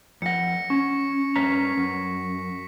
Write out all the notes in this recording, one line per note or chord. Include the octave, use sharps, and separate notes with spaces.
F2 F#5 A#6 C#7
C#4 C#6
G2 C#4 A#5 B6
F#2